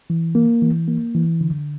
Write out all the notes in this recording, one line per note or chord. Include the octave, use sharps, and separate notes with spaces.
E3
A#3
E3
A#3
E3
D3